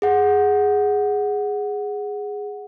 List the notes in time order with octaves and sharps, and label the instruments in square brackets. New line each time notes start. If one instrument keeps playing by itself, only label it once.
[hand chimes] G#4 F#5